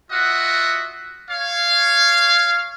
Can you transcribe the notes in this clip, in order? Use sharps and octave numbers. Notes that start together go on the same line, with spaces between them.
F4 F#4 D#5 E5 F#5
C#5 F5